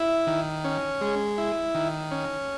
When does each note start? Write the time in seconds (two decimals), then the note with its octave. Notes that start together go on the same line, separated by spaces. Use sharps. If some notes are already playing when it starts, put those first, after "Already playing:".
Already playing: E4
0.27 D#3
0.64 C#4
1.01 G#3
1.38 E4
1.75 D#3
2.11 C#4